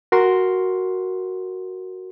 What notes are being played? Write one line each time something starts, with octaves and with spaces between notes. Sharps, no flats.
F#4 A#4 C6